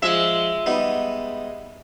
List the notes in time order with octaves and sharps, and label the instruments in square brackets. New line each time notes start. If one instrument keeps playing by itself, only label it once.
[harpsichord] F3 [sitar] G#3 E5
[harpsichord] G3 B3 D#4